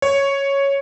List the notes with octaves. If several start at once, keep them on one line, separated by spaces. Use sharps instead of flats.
C#5